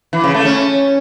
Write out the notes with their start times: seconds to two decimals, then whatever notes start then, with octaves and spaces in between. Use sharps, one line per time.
0.13 E3
0.24 C#3
0.34 A3
0.45 C#4